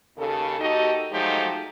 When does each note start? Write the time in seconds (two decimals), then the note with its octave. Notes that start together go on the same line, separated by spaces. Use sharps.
0.17 D#2 C#3 A4
0.60 D#2 D#4 F#4 G4 A4 D#5
1.12 F3 F#3 G#3 A3 D#4 G4